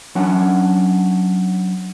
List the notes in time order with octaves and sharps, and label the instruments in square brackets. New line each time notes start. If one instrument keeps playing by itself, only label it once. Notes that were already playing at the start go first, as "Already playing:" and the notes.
[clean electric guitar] F#3 C#4 D4 F#5